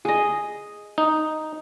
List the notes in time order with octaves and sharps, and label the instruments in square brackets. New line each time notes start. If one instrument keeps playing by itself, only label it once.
[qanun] G#4 D#5
[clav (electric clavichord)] D#4